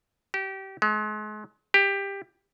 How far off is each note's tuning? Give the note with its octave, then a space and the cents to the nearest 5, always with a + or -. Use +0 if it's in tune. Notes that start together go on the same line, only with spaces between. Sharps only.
G4 -25
G#3 +40
G4 +15